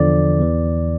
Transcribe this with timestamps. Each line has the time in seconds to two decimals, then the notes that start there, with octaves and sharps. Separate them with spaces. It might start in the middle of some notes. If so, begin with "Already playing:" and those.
Already playing: E2 D3 F3 D5
0.40 E2 E3